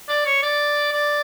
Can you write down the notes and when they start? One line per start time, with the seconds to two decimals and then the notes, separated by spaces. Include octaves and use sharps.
0.08 D5
0.25 C#5
0.43 D5
0.92 D5